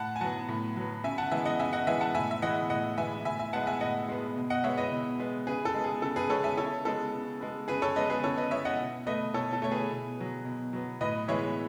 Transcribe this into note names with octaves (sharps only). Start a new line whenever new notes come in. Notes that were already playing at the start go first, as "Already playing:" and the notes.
Already playing: A2 F#5 A5
G#5
F#3 B3 F#5 A5
A2
F#3 B3
C#3 E5 G#5
F#5 A5
E3 G#3 B3 E5 G#5
D#5 F#5
C#3 E5 G#5
D#5 F#5
E3 G#3 B3 E5 G#5
F#5 A5
A2 E5 G#5
E5
E3 G#3 B3 D#5 F#5
A2 D#5 F#5
E3 G#3 B3 E5 G#5
A2 E5 G#5
E5 G#5
G#3 B3 F#5 A5
E5 G#5
A2 D#5 F#5
G#3 B3
B2
D#5 F#5
G#3 B3 C#5 E5
B4 D#5
B2
G#3 B3
C#3 G#4 B4
A4
G#3 B3
G#4
C#3 A4
G#4 B4
G#3 B3 A4 C#5
E5 G#5
C#3 A4 C#5
G#3 B3 A4
C#3
G#3 B3
C#3 G#4 B4
A4 C#5
G#3 B3 B4 D#5
G#4 B4
C#3 A4 C#5
B4 D#5
G#3 B3 C#5 E5
D#5 F#5
B2
A3 B4 D#5
B2 A4 C#5
A4
A3 C#5
G#4 B4
B2
F#3 B3
B2
F#3 B3
A2 B4 D#5
E3 G#3 B3 C#5 E5